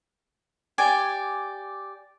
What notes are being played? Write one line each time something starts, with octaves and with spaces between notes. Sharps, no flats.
G4 D5 G#5